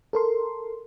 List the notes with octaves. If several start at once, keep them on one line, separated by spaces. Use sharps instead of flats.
A4 A#4 C6